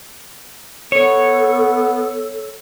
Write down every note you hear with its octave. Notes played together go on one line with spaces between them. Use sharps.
B3 A4 C#5